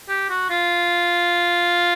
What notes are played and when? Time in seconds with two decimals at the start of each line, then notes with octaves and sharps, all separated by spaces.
0.09 G4
0.30 F#4
0.50 F4